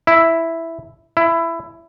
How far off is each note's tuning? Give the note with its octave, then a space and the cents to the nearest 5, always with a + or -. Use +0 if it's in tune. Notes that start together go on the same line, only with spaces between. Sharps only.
E4 +0
E4 +15